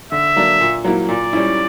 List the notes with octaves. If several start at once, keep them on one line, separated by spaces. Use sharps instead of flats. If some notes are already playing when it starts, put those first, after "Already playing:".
D3 E5
F#3 A#3 D4
A#2
F#3 A#3 E4
A#2 D5
G3 C#4 E4